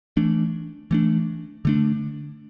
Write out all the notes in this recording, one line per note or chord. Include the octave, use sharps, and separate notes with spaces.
E3 A3 D4
E3 A3 D4
D3 A3 D4